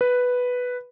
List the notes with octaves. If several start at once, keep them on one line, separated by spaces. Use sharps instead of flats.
B4